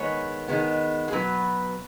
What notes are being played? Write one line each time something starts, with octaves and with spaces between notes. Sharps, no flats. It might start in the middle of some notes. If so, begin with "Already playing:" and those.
Already playing: D#3 G#3 B3 C#5
D#3 G#3 B3
G#4
B2 F#3 B3 B4